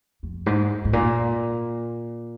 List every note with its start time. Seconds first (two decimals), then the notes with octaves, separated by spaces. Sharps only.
0.23 F2
0.46 G#2
0.85 G#2
0.93 A#2